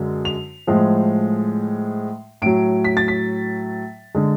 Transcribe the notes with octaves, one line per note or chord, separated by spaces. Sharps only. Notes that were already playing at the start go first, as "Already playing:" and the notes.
Already playing: F#2 D3 G#3
F7
A2 F3 G#3
A2 F#3 D7
B6
A6
B6
D3 G#3